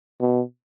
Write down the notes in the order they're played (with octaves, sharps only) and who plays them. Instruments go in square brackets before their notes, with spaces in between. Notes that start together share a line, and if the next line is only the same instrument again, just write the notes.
[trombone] B2